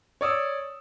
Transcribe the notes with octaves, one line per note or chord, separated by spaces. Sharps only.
C#5 D5 D#6 E6